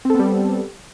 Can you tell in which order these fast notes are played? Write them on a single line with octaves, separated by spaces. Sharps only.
C4 A4 B3 G3